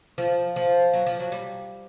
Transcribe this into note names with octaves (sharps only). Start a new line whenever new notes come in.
F3
F3
F#3
F3
F#3
G3